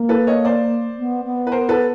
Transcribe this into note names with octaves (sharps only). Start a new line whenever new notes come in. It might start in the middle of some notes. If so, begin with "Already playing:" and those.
Already playing: A#3
A4 B4
C#5 D#5
C5 D5
B3
B3
B4
A#4 C5
A4 B4